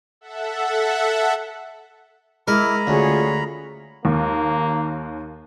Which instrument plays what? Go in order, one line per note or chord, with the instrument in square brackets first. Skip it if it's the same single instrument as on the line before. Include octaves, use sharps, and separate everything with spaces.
[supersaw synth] A4 E5 F#5
[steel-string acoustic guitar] G#3 [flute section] E4 D6 [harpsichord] A#4 [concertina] A#5 B5
[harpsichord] D2 [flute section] C#4 F4 G#4
[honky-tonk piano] D#2 [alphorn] A#3